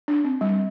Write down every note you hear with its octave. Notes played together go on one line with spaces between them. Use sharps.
D4
C4
G3